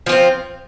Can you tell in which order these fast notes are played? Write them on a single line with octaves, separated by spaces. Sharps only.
F3 F4 C4